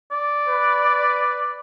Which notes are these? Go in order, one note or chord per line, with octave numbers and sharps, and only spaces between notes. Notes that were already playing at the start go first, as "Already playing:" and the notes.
D5
B4